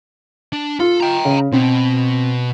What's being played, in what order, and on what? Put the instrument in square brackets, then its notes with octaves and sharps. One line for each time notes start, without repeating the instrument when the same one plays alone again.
[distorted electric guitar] D4
[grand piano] F4 [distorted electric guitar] A4
[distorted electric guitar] G5 A#5
[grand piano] C#3
[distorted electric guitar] B2 [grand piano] C4